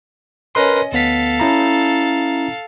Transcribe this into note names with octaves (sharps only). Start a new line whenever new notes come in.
C#4 A#4 B4 D#5 C6
D2 B3 A4 F5 B6
C#4 E4 A#5